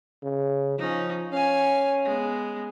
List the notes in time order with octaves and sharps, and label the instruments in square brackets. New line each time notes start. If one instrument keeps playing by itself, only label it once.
[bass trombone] C#3
[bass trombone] F3 [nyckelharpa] C#4 D#4
[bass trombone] C#4 [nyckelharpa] F5 G#5
[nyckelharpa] G#3 B3